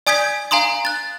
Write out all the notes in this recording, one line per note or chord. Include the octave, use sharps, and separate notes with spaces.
D5 G#5 D#6 G6 G#6 B6
F5 G#5 A#5 C6 D#6
F#6 A6